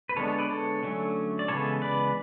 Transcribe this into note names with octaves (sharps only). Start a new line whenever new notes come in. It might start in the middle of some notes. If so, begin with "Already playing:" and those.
B4
D3 G#3 B3 D4 A4 C#5
A4 C#5
B4 D5
A4 C#5
D3 F#3 A3 C#4
D5
C#3 E3 G#3 B3 A4 C#5
B4 D5